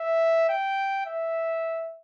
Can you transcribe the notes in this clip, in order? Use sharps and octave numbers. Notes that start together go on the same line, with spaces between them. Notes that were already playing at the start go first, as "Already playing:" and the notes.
Already playing: E5
G5
E5